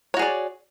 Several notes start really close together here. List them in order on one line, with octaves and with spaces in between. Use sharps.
C#5 F#4 G#4 D5